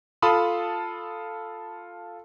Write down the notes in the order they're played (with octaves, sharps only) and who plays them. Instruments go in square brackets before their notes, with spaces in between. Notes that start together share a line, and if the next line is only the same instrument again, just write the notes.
[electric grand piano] F4 A4 A5 B5 C6 D#6